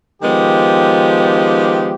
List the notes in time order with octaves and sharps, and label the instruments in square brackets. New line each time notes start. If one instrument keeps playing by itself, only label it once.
[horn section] D#3 F3 G#3 B3 G4